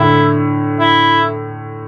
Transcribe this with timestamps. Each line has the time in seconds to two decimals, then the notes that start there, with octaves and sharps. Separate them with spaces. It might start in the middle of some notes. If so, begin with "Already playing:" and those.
Already playing: A2 D3 E4
0.80 E4